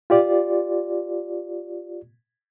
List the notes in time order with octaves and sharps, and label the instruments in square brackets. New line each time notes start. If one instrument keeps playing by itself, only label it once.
[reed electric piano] F4 G4 D5